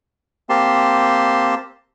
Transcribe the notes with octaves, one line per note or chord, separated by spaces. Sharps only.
A#3 C4 G4 A5 C6